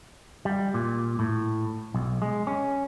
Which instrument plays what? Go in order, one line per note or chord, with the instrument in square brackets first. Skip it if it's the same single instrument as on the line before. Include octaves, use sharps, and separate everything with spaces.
[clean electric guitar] G3
A#2
A2
B1
G#3
C#4